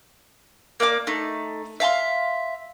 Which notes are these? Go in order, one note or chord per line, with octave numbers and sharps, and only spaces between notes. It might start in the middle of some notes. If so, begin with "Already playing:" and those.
A#3 D5 F5 D6
A3 D#4
E5 F5 A5 C6